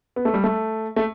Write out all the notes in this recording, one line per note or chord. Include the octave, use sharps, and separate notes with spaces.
B3
A3
G3
A3
A3